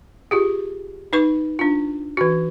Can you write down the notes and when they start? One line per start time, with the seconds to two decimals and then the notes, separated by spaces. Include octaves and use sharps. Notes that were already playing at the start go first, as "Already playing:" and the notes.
0.31 F4 G4 G#4
1.13 D#4 B4 C#6
1.59 D4 F4
2.17 E3 F#4